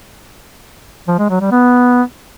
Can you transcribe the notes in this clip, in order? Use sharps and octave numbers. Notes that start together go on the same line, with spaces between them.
F3
G#3
F#3
G3
B3